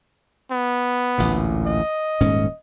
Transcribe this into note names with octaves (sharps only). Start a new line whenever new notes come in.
B3
A1 D2 A#2
D#5
D#1 G#2 C#4